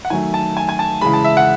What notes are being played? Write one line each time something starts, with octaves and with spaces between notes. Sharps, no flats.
F#5
D#3 F#3 A3 G#5
A5
G#5
G#5
A5
C#3 E3 G#3 B5
A5
E5
F#5